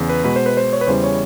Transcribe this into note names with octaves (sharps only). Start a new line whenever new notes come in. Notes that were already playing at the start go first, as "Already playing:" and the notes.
Already playing: E2 C#3
B4
B2 G#3 B4
C5
B4
C5
C#5
B4
E2 C#3 E3 G3 C5
C#5